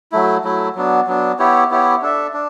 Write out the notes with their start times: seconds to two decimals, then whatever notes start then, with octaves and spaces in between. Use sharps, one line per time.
0.12 F#3 A3 E4
0.44 F#3 A3 E4
0.75 F#3 B3 D4
1.07 F#3 B3 D4
1.39 B3 E4 G4 C#5
1.70 B3 E4 G4 C#5
2.02 D4 A4 E5
2.34 D4